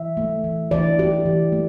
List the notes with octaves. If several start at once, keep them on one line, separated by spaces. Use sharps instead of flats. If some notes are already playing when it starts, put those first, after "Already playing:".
Already playing: E3 E5
A3
E3
E3 D5
E3 G4
E3
A3